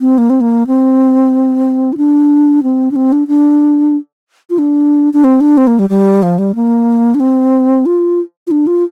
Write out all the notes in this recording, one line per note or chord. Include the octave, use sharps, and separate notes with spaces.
C4
A#3
C4
A#3
C4
F4
D4
C4
D4
C4
D4
D4
F4
D4
D4
C4
D4
C4
A#3
G3
G3
F3
G3
A#3
D4
C4
F4
F4
D4
F4